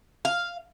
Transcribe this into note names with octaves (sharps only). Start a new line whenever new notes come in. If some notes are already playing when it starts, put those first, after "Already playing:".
F5